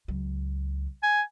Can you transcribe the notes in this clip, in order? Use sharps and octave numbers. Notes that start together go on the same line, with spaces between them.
C#2 F#3
G#5